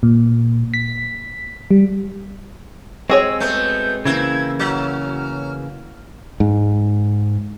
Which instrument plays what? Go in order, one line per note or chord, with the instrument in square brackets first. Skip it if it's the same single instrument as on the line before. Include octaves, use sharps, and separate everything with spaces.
[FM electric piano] A#2
B6
G3
[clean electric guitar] G#3 C4 [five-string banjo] F#4 G#4 C#5 [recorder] E6
[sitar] A3 B3 [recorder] G6
[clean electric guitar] C#3 E3 A#3 [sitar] C4 E4 [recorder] G#6
[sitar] F#3 [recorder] F6
[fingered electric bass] G#2